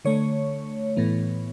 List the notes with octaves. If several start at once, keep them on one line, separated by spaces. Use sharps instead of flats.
D3 A3 C#5
A2 E3 B3